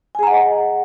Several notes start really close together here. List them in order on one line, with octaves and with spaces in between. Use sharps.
G#5 G#4 A#5 F#5 D#5